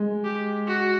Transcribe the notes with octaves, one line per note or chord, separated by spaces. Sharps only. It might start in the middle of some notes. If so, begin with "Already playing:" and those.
Already playing: G#3
G4
F#4